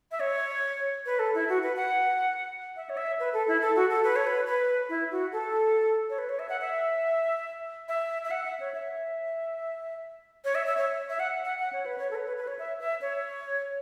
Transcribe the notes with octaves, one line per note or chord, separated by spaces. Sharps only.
E5
C#5
B4
A4
E4
F#4
B4
F#5
E5
C#5
E5
B4
A4
E4
A4
F#4
A4
B4
C#5
B4
B4
E4
F#4
A4
C#5
B4
C#5
E5
F#5
E5
E5
E5
F#5
E5
C#5
E5
C#5
E5
E5
C#5
E5
F#5
F#5
F#5
C#5
B4
C#5
A4
B4
B4
B4
C#5
E5
E5
C#5